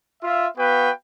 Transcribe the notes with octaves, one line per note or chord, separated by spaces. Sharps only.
F4 E5
B3 F#4 B4 F5 G5